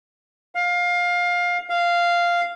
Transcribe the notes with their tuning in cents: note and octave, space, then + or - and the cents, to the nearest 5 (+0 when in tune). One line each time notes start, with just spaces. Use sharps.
F5 +20
F5 -5